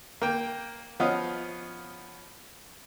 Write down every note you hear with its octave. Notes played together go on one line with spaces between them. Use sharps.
A#3 G5
F3 B3 C#4 D#5 F5